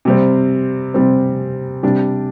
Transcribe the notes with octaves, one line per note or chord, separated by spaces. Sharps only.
C3 G3 C4
C3 G3 C4
C3 G3 D4